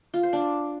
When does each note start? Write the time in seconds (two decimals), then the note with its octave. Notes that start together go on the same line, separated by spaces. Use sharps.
0.14 F4
0.23 C5
0.33 D4